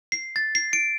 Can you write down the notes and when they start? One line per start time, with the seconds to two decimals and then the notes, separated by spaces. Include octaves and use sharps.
0.12 C7
0.36 A6
0.55 C7
0.73 D7